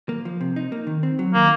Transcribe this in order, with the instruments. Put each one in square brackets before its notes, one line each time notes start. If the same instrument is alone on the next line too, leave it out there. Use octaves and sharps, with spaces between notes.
[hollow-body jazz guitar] A#3
F3
C3
D#4
A#3
D#3
C4
F#3
[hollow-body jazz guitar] D#3 [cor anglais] A#3